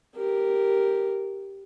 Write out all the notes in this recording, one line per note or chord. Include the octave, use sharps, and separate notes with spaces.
G4 A#4